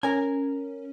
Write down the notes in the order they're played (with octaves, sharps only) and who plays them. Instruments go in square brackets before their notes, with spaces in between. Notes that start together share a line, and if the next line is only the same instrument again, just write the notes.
[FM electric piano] C#4 [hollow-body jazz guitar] A#4 G#5